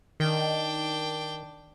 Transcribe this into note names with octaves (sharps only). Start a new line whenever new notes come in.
D#3 D4 G5